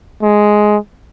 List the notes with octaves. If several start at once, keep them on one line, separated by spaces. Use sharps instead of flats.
G#3